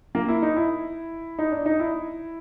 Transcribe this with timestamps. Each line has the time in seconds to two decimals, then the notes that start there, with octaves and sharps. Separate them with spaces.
0.15 A#3
0.28 E4
0.42 D#4
0.57 E4
1.39 D#4
1.52 D4
1.66 D#4
1.80 E4